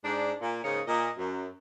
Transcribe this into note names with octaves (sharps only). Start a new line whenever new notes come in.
G#2 D4
A#2
G#2 C#3 A#3 D#4 C#5
A#2 D#5
F#2